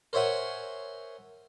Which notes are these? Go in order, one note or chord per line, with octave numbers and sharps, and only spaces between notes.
A#4 C5 C#5 E5 F#5 G#5